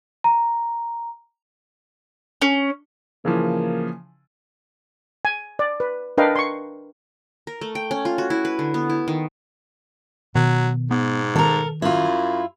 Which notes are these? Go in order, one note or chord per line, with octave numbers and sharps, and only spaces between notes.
A#5
C#4
C#3 E3 F3 A#3
G#5
D5
B4
D4 A#4 B4 D#5 F5 G5
C6 C#6
A#4
A3
G5
C#4
F4
F#4
E4
B4
D3
B3
E4
D#3
B2 D#3 F#3
G#2 B3
D#3 A4 A#4
F#2 E4 F4